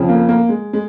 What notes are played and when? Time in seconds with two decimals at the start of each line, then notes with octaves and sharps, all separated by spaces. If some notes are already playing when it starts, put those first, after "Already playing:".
Already playing: F2 C#3 F3
0.09 A#3
0.29 A#3
0.49 G#3
0.73 G#3